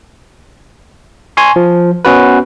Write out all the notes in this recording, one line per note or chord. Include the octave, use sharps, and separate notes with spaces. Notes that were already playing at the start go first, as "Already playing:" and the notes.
G#5 C6 C#6
F3
B3 C#4 F#4 B4